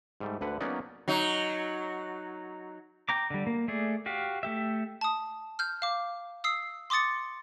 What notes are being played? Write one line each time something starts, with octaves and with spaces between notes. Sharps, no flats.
G#2 G3 A3
D2 D3 B4 F#5
F#3 A#3 B3 C#4 D#4 D5
F#3 D#4
G5 A#5 D6
D3 G3
A#3
A3 G#4 D5
F#4 G4 F5
A3 G4 E5
A5 D#6
F6 G6
F5 D6
D#6 E6 C7
C6 D6 D#6 A6 C#7